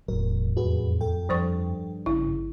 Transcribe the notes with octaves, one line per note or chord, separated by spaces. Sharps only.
E1 E2 A2 F#3 A#4
F2 F#4 G#4 B4
A4 G5
G2 F3 C5 C#6
G#1 C#3 E4